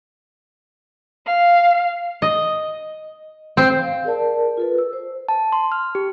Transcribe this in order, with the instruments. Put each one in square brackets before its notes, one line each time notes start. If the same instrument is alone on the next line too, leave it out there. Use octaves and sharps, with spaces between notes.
[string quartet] F5
[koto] D#5
C4
[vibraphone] F5
G#4 A#4 D5 A5
F4 A4 B4
E6
C5
[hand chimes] A5
C6
F6
G4